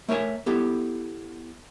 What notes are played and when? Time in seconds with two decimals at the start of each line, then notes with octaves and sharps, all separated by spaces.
0.08 A3 A#4 C#5 E5 G#5
0.46 B3 E4 G4 A4